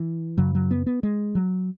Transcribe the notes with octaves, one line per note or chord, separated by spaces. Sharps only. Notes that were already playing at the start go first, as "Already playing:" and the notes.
Already playing: E3
F#2 C#3 F#3
F#3
B3
B3
G#3
F#3